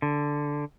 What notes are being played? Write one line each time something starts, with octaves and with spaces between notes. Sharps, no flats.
D3